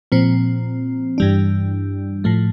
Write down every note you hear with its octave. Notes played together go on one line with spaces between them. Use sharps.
A#2 F3 C4
G2 E3 G3 D4
A2 F3 A3